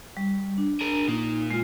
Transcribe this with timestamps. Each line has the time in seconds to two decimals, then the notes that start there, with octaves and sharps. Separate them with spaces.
0.17 G3
0.58 D4
0.81 G#4 A#4
1.08 A#2 A#3 D#4
1.51 G#3 F4